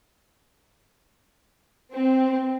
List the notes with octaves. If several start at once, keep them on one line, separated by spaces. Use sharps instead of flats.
C4